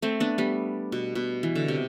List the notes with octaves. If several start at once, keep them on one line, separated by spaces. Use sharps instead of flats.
A3 C4
B3 D4
G3 B3
B2
B2
E3
D3
C3